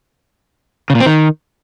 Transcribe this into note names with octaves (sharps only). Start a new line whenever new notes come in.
C#3
A#2
C4
D#3